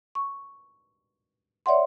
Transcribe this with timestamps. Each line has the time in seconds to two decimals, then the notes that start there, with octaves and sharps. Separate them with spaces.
0.15 C#6
1.66 C#5 D5 E5 F#5 C6